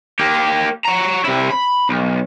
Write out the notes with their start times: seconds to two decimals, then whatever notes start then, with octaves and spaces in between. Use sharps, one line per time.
0.19 A#3 G4
0.85 C#5 A#5
1.25 C3 E4
1.51 B5
1.89 B1